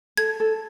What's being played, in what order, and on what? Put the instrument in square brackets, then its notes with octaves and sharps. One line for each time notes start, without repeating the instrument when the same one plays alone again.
[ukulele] A4 [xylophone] G#6
[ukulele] A4